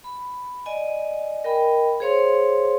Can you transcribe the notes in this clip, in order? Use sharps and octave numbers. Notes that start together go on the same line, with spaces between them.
B5
D5 D#5 G#5
A#4 D#5 G5 B5
G#4 C5 C#5 F5 C6